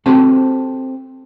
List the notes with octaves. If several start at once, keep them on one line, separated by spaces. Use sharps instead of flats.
C4 F#4 G4 A4 C5 A5